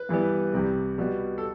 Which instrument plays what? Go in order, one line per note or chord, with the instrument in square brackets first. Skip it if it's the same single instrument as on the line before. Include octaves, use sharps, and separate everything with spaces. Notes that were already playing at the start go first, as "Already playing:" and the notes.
Already playing: [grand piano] B4
G2 E3 G3 B3
C2 C3 G3
B2 G3 B3
A4